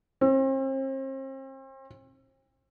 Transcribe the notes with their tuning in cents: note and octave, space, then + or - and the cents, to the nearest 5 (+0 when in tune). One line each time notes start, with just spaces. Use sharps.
C4 +40